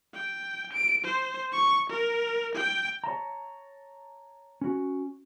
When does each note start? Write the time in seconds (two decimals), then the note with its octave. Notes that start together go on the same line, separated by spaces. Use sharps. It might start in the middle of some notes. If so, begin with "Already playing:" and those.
0.14 G5
0.73 D7
1.04 C5
1.52 C#6
1.90 A#4
2.55 G5
3.04 C#5 A5 A#5
4.61 C#4 F#4